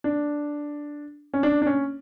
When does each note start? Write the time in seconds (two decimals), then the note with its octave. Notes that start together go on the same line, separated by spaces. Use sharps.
0.04 D4
1.34 C#4
1.43 D4
1.62 D4
1.66 C#4